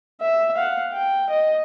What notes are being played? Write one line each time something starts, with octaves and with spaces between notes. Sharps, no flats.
E5
F5 F#5
G5
D#5